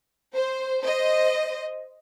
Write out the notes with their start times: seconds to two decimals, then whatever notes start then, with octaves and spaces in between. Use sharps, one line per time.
0.35 C5
0.84 C5 D#5